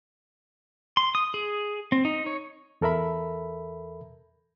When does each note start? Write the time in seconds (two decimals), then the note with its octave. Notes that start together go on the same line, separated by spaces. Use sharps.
0.97 C6
1.15 D#6
1.34 G#4
1.92 C4
2.05 D#4
2.26 C#5
2.81 E2 A4 A#4 E5 B5